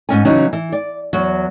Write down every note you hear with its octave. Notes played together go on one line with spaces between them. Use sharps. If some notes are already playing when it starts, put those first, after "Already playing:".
G#2 C#4 G#5
C#3 E3 F#3 B3 C#4 D#4
E3
D5
E2 F#3